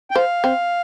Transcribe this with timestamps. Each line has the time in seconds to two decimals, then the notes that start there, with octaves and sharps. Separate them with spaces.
0.11 G5
0.16 C5 F5
0.44 C4